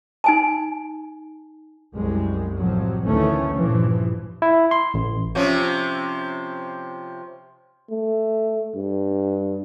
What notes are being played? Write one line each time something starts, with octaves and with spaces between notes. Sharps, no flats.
D#4 G#5 A5
C2 F#2 G#3
A1 C3 F3 F#3
D2 D#3 E3 A3 C#4
G2 A#2 E3 F3
E4
C6
A1
C3 F3 C#4
A3
G2